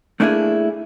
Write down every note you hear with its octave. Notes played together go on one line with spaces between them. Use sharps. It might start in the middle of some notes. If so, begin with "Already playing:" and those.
A3 A#3 D4 E4 G4 G#4